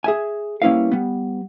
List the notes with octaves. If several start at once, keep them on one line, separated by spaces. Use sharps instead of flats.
G#4 E5 G#5
G3 A#3 C#4 E4 B4 F5
G3 B3